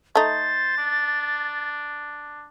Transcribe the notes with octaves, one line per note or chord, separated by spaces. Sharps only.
A3 D#4 C5 A6
D4